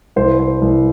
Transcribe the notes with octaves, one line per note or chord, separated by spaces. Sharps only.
C2 C5
B4
C5
C2 B4